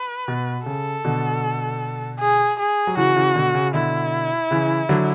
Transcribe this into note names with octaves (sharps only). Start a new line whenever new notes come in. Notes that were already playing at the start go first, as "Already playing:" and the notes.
Already playing: B4
B2
C#3 A4
B2 D3
G#4
G#4
F#3
C#3 E3 F#4
C#3 E3
B2 D3
C#3
B2 D3 E4
C#3 E3
D3 F#3